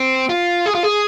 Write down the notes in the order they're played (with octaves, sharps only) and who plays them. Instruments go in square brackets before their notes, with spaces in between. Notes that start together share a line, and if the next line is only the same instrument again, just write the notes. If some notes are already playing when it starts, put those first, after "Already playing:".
Already playing: [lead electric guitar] C4
F4
G#4
F4
G#4